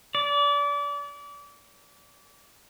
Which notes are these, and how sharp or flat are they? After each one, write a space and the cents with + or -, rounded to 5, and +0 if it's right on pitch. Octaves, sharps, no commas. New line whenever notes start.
D5 -30